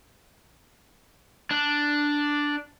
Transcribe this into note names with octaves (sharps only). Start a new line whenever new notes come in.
D4